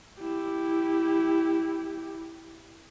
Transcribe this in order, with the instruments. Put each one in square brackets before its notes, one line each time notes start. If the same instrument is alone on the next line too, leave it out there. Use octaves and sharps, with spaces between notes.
[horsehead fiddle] E4 G4